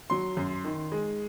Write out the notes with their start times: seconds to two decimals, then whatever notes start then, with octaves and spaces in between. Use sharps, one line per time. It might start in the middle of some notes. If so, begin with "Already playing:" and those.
0.10 F#3 C6
0.37 F#2
0.65 D#3
0.92 G#3